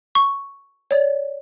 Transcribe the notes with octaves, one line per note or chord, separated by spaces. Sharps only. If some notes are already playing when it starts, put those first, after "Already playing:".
C#6
C#5 D5